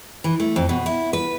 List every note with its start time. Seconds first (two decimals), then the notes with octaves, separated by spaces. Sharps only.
0.24 E3
0.40 A3
0.56 F2
0.69 B2
0.86 E4
1.13 B4